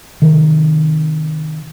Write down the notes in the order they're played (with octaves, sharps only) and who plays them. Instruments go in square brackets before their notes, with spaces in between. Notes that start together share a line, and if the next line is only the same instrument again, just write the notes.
[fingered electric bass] C3 D#3